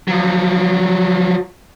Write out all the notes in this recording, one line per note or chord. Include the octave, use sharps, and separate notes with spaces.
F3 F#3